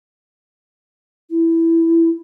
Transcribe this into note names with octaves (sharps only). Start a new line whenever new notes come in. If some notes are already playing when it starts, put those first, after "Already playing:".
E4